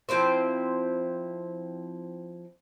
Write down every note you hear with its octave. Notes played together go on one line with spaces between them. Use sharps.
F3 C4 E4 C5